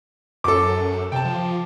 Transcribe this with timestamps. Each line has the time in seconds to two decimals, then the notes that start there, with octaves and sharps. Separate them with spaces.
0.44 F#2 A4 D6
1.12 C3 G5 A5
1.25 F3